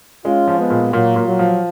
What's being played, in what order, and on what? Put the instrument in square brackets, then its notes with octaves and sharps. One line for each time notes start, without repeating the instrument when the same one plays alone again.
[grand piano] G#3 [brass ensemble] C#4 F4
[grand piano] F3
[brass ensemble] G#3 B3
[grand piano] A#2
[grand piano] A#2 [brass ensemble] F#3 A#3
[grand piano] A#2
[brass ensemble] F#3
[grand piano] F3